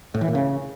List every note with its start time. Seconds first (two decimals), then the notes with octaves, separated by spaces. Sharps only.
0.15 A2
0.21 E3
0.28 A#2
0.35 C#3